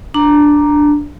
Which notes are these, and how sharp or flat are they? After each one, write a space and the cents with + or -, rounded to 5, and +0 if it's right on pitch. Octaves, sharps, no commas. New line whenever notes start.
D4 +0 A#5 +0